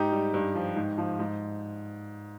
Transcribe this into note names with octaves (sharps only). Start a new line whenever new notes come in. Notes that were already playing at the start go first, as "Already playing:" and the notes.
Already playing: G#2 D#4 G4
G3
G2
F3
G#2
F3
G#2